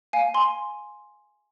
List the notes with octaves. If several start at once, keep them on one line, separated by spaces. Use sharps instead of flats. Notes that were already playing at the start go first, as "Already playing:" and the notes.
F5 G#5
G#5 C6